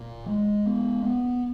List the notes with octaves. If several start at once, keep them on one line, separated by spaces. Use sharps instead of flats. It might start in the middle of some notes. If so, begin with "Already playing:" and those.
Already playing: A#2
G#3
B3
B3